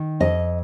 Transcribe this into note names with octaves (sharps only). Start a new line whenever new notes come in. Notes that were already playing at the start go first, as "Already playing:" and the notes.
Already playing: D#3
F2 D#5